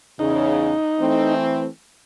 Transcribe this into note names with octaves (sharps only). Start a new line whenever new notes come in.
E2 C#3 D#4
E3 A3 C4